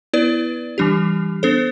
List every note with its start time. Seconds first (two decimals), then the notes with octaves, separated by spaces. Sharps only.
0.13 B3 E4 B4 D5
0.78 E3 G3 D4 G4
1.43 B3 D4 A4 C5